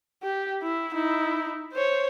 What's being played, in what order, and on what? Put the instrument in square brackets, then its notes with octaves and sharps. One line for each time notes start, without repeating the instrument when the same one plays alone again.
[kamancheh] G4
E4
D#4 E4
C5 C#5